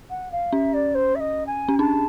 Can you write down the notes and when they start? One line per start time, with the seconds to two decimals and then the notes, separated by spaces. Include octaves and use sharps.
0.10 F#5
0.31 F5
0.52 C#4 E5
0.73 D5
0.94 C5
1.15 E5
1.20 D#5
1.46 G#5
1.69 C#4
1.79 D4 A5